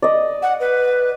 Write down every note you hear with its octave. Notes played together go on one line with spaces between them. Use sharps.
D5 D#5
F#5
B4